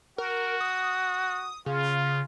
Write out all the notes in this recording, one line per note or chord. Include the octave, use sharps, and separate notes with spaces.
F#4 A#4
D#6
C#3 F4